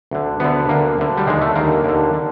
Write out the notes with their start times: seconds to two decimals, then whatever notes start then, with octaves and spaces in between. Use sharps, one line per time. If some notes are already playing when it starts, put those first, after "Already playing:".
0.11 D2 D3
0.40 D2 D3 B3
0.69 D2 D3 A#3
0.98 D2 D3
1.17 G3
1.26 D#2 D3 G#3
1.41 A3
1.55 D#2 D3 A#3
1.84 D#2 D3
2.13 D3